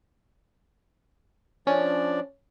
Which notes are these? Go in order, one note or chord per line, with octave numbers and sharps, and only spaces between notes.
F3 C#4 D4 D5